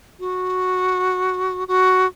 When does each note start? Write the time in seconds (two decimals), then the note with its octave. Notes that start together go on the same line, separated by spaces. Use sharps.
0.20 F#4
1.68 F#4